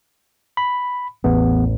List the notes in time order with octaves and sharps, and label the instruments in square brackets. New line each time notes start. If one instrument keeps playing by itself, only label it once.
[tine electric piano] B5
[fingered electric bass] A1 [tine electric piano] E2 B3